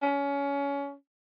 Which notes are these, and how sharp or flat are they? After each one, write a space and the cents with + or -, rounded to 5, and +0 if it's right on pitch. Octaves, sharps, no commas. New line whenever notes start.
C#4 +25